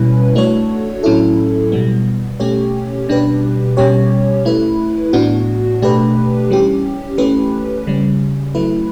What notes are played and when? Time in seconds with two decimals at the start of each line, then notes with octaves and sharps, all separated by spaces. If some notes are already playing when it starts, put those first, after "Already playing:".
Already playing: B2 G3 C#4 E4 B4
0.35 A3 D4 F#4 A4 C#5
1.03 A2 F#3 C#4 E4 A4
1.72 B2 G3 B3
2.40 B2 A3 C#4 G4 C#5
3.09 B2 G3 D4 G4 B4
3.77 B2 G3 C#4 G4 C#5
4.45 A3 E4 B4
5.13 A2 E3 B3 D4 F#4
5.82 B2 A3 D4 G4 B4
6.50 E3 G3 C#4 G4
7.18 E3 A3 C#4 G4 B4
7.87 C#3 G3 C#4
8.55 F#3 A3 E4 B4